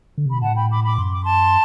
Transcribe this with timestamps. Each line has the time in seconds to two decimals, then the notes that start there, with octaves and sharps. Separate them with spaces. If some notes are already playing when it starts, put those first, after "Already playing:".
0.18 D3
0.26 C3
0.30 B2 B5
0.41 A2 F#5 A5
0.55 G5 B5
0.69 B5 D6
0.84 B5 D6
0.98 F#2 C6
1.11 D6
1.23 A5 C6